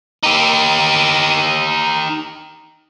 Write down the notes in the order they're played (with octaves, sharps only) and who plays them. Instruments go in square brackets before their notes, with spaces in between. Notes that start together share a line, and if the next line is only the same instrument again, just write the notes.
[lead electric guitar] D#4 G4